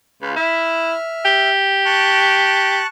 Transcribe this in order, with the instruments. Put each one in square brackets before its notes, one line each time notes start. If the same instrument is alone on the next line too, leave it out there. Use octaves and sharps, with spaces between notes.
[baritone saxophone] C#2 [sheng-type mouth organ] F4 B4
[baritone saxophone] E4 [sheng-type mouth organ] E5 F6
[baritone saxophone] G4
[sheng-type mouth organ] A5 C#6 F#6